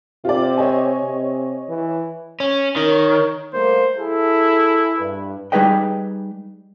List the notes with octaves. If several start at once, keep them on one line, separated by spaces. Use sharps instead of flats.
C3 F4 G4 D5
C#5 D#5 G#5
C3
E3
C#4
D#3 A#4 C#5
G3 A3 A#3 C5
E4 G#4 A4
G2 B4
G3 D#4 G#4 B4 D#5 G5